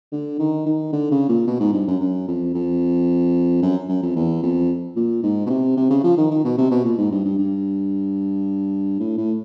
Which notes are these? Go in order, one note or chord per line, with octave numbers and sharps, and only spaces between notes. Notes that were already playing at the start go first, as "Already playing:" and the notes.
D3
D#3
D#3
D3
C#3
A#2
B2
G#2
G2
F#2
F#2
F2
F2
F#2
F#2
F2
E2
F2
A#2
G#2
B2
C3
C3
C#3
F3
D#3
D#3
B2
C3
B2
A#2
G#2
G2
G2
G2
A2
A2